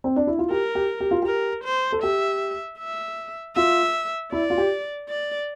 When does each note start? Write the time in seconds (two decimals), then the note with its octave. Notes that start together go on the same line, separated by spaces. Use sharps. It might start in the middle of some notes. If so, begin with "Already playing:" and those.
0.04 C4
0.16 D4
0.27 E4
0.38 F4
0.50 G4 A#4
0.75 G4
1.00 G4
1.11 F4
1.22 G4 A#4
1.64 C5
1.92 A4
2.03 G4 E5
2.79 E5
3.56 F4 E5
4.32 E4 D5
4.50 F4
4.58 G4
5.09 D5